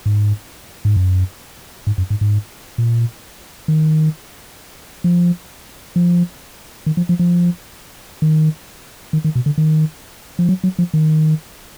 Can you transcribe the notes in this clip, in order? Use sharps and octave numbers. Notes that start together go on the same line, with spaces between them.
G#2
G#2
F#2
G#2
F#2
G#2
G#2
A#2
D#3
F3
F3
D#3
F3
F3
F3
D#3
D#3
D#3
B2
D3
D#3
F3
F#3
F#3
F3
D#3